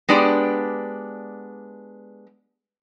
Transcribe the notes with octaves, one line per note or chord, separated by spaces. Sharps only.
G#3 B3 D4 G4 D5